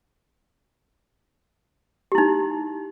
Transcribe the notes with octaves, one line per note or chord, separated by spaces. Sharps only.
D#4 E4 G4